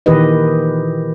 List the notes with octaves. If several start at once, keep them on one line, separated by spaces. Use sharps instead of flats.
A#2 D#3 E3 G4 B4 D#5